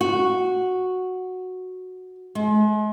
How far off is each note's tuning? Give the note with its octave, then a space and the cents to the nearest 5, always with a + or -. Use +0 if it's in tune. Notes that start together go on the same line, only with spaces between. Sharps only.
F#4 -5
G#3 +40